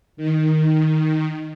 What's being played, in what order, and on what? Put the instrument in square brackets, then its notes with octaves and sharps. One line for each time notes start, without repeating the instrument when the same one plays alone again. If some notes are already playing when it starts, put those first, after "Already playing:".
[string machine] D#3